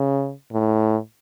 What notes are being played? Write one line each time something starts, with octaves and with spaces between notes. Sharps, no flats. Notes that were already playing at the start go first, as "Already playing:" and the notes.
Already playing: C#3
A2